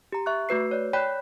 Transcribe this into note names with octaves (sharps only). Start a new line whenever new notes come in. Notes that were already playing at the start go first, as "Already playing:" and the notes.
G4 A#5
E5 C#6 F#6
A3 F#4 B4 C7
C#5 D5
C#5 D5 G5 B5 F#6 B6